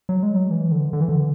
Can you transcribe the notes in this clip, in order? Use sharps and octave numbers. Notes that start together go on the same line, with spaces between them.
F#3
G#3
F#3
E3
D3
D3
E3
D3